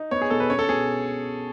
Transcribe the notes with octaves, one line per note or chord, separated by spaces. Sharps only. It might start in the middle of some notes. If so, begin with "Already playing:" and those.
Already playing: D#4
B3 C#5
G#4
B2 A4
B4
C#4 C#5
A4
B2 G#4